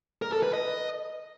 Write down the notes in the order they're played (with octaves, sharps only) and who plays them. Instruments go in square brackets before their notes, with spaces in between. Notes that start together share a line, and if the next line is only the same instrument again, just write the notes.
[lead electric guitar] A#4
A4
B4
D#5